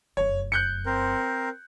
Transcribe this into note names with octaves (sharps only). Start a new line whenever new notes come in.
F1 F#2 C#5
F#6 G6 C#7
C4 A#4 C5